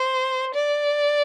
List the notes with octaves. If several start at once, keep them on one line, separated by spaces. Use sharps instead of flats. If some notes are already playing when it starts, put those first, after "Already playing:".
Already playing: C5
D5